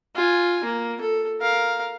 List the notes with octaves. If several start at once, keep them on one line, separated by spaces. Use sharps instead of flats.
F4 G#5
A#3
A4
A#4 F5